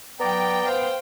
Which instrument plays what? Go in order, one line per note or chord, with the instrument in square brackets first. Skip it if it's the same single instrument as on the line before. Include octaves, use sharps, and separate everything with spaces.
[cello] F#3 [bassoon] B3 [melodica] D5 A#5 [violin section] G5
[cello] C5 F5